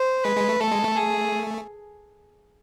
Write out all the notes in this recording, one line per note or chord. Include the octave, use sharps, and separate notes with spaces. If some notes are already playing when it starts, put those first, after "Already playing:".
Already playing: C5
G#3 B4
G#3
A3
A3 A4
G#3
A3
G#4